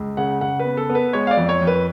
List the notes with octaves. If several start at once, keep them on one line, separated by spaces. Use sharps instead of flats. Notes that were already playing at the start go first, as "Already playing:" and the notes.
Already playing: C#2
C#3 F#5
C#3 F#5
B4
B3
A4
B3
B4
G#3 C#5
F5
D5
F2
C#5
F2
B4